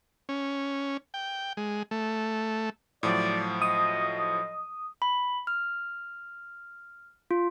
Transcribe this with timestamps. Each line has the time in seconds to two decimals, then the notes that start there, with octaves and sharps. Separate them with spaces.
0.29 C#4
1.14 G5
1.57 G#3
1.91 A3
3.03 A2 F3 F#3 D5
3.62 D#5 D#6
5.02 B5
5.47 F6
7.31 F4